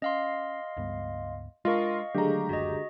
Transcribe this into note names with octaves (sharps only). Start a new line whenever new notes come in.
C#4 D#5 F5 C6
C#2 G2 B3
G#3 D4 F4 A#4 D#5 F5 C#6
D3 D#3 F#3 G#3 A3 G4 A#5
F#1 D2 F#4 D#5